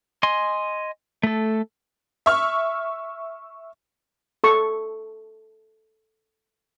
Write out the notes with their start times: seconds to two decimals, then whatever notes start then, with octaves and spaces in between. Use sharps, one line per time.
0.23 D#5 G#5 C6
1.23 A3 A4
2.26 E5 C#6 F6
4.44 A4 C#6